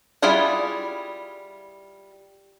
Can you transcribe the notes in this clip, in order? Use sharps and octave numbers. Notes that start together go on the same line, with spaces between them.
G3 E4 F4 G#4 F#5